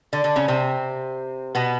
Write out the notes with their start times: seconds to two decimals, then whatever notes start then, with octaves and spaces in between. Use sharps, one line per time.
0.13 D3 D4
0.24 D3 D4
0.36 C#3 C#4
0.48 C3 C4
1.55 B2 B3